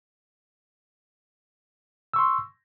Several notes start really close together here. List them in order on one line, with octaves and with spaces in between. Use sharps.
E6 C#6 C6